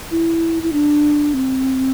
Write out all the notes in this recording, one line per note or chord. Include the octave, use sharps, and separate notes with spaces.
E4
E4
D4
C4